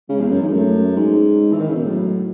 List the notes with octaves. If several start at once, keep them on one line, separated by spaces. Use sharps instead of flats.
C#3 G#3
E2
F#2
G#2
F#2 A3
G#2 G#3
E3
D#3
C#3
B2
A2 F#3